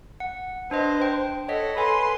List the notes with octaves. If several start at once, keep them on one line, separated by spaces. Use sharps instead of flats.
F#5
D4 B4 C5 D#5
G5
A4 C#5 D#5 F#5 B6
A4 B4 G#5 B5 C6